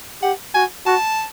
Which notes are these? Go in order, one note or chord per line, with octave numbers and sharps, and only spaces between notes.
G4 F#5
F#4 G#5
F#4 A5